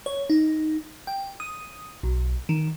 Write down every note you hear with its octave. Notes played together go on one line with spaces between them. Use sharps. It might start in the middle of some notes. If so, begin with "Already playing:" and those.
C#5
D#4
G5
D#6
B1
D#3